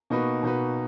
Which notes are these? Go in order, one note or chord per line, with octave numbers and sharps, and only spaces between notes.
B2 A#3 D#4 F#4 B4
B2 A#3 D#4 F#4 B4